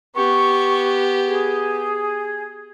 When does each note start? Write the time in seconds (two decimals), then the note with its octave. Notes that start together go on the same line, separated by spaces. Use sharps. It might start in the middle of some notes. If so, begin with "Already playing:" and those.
0.16 B3 G4 C#6
1.28 G#4